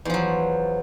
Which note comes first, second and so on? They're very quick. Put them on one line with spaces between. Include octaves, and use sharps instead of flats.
E2 F3 F#3